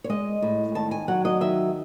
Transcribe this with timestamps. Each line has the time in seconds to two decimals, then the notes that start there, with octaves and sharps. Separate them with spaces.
0.04 C#5
0.09 G#3 D#5
0.42 A2
0.75 D#3 A5
0.91 G#5
1.08 F#3 F#5
1.25 D#5
1.41 D#3 E5